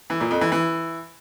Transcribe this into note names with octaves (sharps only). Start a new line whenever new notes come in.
E3
A#2
F2
E3
E3